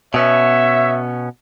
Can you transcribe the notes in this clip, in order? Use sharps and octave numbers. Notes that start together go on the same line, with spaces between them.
B2 B3 C#4 C#5 E5